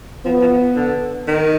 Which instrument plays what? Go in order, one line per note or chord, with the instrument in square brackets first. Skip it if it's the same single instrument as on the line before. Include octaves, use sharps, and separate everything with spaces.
[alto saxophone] F3 [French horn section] B3
[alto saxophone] F3
D3
D#3